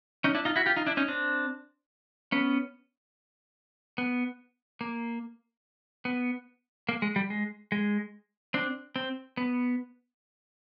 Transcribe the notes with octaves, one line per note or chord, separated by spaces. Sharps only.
C#4 D#4
D4 E4
D#4 F4
E4 F#4
F4 G4
D#4 F4
D4 E4
C#4 D#4
C4 D4
B3 C#4
B3
A#3
B3
A#3
G#3
G3
G#3
G#3
C4 D4
C4
B3